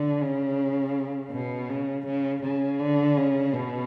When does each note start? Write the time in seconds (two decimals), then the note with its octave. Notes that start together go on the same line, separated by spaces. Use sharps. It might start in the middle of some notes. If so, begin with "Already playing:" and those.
Already playing: D3
0.22 C#3
1.32 B2
1.70 C#3
2.07 C#3
2.43 C#3
2.80 D3
3.17 C#3
3.54 B2